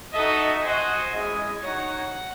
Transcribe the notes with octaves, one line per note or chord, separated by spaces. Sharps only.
D#4 F#4 A4 D#5 E5
F#4 C5 D#5 F#5 G#5
G#3 C#4 E4 G#4 D#5
D#4 F#4 C#5 F#5